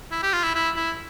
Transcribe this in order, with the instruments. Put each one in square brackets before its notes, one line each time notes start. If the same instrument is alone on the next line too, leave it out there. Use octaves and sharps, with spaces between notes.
[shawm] E4
G4
F4
E4
E4
E4